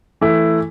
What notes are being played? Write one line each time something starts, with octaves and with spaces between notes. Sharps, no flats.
E3 A3 E4 A4